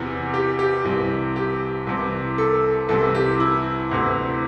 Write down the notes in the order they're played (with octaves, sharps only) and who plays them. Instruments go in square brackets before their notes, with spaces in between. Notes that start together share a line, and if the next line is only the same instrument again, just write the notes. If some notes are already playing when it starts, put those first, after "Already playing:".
Already playing: [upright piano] E2 C3 E3
G4
G4
C2 C3 E3
G4
C2 C3 E3
A4
C2 C3 E3 A4
G4
E4
D2 C3 E3